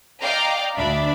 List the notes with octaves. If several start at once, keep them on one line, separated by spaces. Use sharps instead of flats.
D5 D#5 F5 G5 A#5 D6
D2 D4 D5 E5 B5